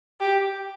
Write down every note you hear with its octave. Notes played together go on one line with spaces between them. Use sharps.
G4